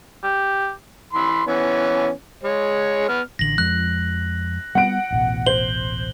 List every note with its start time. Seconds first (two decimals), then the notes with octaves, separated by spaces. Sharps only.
0.24 G4
1.13 E3 B5 C6
1.47 E3 B3 C#4
2.43 G#3 C#5
3.09 B3 F6
3.39 A1 D3 A#6 F#7
3.58 F2 F3 G#3 F#6
4.75 G3 B3 F#5 D7
5.10 D1 A1 B2
5.46 C5 F#7 G7